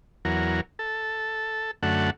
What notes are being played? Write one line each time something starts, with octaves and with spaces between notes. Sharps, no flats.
E2 F#3 A#4
A4
F#2 D3 A3 F#5